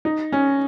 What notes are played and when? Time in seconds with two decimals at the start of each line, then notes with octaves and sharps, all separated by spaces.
0.05 D#4
0.32 C#4